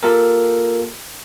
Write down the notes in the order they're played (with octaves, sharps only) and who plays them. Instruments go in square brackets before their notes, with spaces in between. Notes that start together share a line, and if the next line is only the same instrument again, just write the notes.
[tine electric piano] A#3 F4 G4 A4 A#4